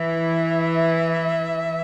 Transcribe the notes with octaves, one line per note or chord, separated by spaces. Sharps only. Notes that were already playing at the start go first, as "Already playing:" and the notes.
Already playing: E3 E5